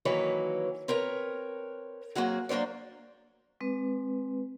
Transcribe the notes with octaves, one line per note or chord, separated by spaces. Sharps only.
D#3 E3 F#3 A#3 B4 C#5
C4 A#4 B4 C#5
F#3 A#3 C4 F#4 G#4
F#3 A#3 D4 C5 D5
G#3 C4 B4